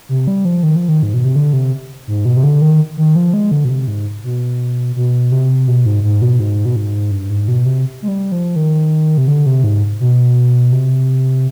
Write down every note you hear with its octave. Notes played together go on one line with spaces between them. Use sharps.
C3
G3
F3
D#3
F3
D#3
G#2
B2
C3
D3
C3
G#2
B2
C3
D3
D#3
D#3
F3
G#3
D3
B2
C3
G#2
B2
B2
C3
B2
G#2
G#2
B2
G#2
B2
G#2
G2
G#2
B2
C3
G#3
G3
F3
D#3
C3
D3
C3
G#2
B2
C3